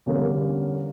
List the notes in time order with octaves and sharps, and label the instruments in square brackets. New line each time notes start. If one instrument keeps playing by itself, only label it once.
[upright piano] E2 D3 G3 A#3 C#4